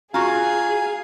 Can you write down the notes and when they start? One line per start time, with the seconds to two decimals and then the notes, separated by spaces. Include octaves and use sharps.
0.14 F4 F#4 G#4 F5 G#5 A#5